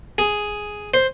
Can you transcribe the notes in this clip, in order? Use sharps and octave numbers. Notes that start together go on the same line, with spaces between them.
G#4
C5